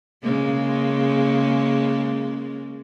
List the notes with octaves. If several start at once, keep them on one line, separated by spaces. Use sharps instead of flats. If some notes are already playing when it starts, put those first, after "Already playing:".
C#3 G#3 A#3